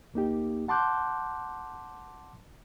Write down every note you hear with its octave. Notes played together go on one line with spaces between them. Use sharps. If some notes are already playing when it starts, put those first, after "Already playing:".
D2 A#3 D#4 G4
F#5 A5 C6 D6 F#6 G6